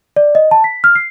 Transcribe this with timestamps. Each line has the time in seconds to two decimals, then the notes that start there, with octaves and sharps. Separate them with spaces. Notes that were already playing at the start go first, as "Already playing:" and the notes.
0.16 D5
0.35 D#5
0.51 A5
0.64 B6
0.84 F6
0.95 C7